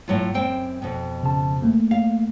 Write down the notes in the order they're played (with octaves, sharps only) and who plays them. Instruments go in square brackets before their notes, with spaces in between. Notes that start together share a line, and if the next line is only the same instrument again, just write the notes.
[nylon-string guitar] A2 F#3 F4
F#2 C4 G5
F2 B2
[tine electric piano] C#3 A5
A3 A#3
[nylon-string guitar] F5